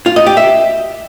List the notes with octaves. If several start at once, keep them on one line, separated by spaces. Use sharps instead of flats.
F4
D#5
G4
E5